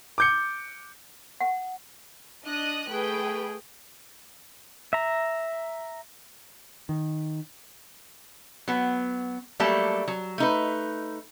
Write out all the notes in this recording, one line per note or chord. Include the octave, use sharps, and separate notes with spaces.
D6 G6 C#7
F#5
D4 D#5 D#6 F#6
A3 G#4 B4 G5
E5 A#5
D#3
F#3 B3
F#3 G3 A3 A#3 A4
F#3
A3 D#4 B4